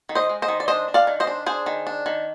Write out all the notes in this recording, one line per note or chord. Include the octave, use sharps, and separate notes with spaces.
D#3
C5 D#5
G#3
C5 D#5
D#3
D5
D4 C5 D#5
D4
D5 F5
D#3
C5 D#5
D4
D4 G#4 C5
D#3
D4
D#3